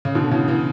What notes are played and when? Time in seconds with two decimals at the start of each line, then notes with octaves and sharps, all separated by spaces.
0.05 C#3
0.15 B2 D3
0.31 C#3 E3
0.48 C#3 E3